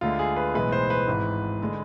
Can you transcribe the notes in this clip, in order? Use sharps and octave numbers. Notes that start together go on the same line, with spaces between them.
D2 D3 G#3 F4
G#4
B4
B1 A2 E3 G#3 B3 B4
C5
B4
G#1 G#2 E3
D3 G#3